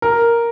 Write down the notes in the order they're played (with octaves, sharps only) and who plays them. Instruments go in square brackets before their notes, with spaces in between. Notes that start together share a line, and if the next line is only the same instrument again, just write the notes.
[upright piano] A#4